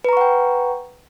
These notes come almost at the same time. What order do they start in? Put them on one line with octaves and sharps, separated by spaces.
B4 A#5 C#6 F#5 G5